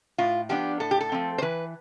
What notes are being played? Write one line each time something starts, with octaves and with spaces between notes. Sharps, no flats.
A2 F4
F3 B3 D4 G4
A2 A4
G4
A4
F3 A3 C4
C5
E3 B4